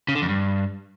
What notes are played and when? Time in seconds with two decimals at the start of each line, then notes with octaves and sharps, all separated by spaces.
0.08 C#3
0.15 D3
0.22 F2
0.29 G2